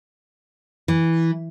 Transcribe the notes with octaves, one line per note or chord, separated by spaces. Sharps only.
E3